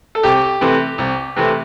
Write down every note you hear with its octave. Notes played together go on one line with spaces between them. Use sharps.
A4
C2 G4
C3 E3 A3 C4
C2
C3 E3 A3 C4